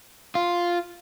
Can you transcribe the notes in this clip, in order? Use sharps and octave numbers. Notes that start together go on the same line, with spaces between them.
F4